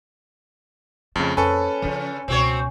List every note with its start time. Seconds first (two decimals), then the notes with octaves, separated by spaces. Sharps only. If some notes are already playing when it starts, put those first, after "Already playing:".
1.16 F2 C#3 A3
1.37 F2 C#4 A4 B4
1.82 C#3 F3 F4
2.28 C#2 B2 C4 F#4 C#5